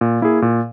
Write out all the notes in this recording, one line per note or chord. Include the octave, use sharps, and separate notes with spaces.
A#2
A#3 E4 G#4
A#2